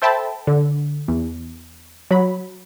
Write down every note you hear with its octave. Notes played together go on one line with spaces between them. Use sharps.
A4 C5 E5 G5 A5 B5
D3
E2
F#3 B5